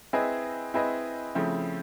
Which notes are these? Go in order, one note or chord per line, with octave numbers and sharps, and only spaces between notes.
C4 E4 G#4 B4 D#5
C4 E4 G#4 B4 D#5
C#3 F3 A3 C4 E4